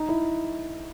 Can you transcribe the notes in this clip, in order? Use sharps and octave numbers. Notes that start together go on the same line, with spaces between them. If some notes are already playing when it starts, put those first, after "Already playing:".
Already playing: D#4
E4